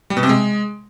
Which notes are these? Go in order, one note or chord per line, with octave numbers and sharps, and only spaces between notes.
G3
B2
C3
G#3